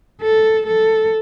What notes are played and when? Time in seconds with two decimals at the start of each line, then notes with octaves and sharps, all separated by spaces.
0.22 A4
0.67 A4